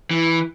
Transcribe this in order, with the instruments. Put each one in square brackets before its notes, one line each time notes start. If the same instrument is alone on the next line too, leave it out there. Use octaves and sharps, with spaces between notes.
[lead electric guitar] E3